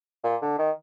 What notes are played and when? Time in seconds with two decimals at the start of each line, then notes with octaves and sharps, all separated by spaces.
0.24 A#2
0.42 D3
0.58 D#3